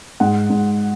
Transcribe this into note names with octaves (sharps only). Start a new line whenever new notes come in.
G#2 F#5
G#2